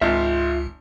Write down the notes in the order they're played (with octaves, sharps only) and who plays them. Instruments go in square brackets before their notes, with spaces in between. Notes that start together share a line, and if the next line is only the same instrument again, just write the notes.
[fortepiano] G#1 D#4 F5 [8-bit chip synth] C#2 [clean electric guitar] F4 E5